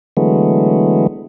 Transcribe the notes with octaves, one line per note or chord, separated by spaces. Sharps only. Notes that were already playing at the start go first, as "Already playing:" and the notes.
D3 E3 F#3 G#3 A3 B3